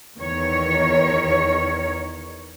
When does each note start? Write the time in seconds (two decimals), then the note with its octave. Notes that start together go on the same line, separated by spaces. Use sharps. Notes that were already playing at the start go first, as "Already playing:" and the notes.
0.18 E2 D#3 C#5